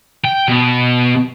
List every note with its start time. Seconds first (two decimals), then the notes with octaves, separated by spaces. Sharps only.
0.24 G5
0.48 B2